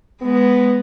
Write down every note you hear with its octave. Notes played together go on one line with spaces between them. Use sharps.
G#3 B3